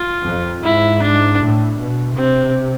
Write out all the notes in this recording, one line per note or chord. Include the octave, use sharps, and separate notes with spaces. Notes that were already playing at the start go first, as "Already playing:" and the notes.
Already playing: F4
F2
G#2 E4
D4
A2
B2
C3 C4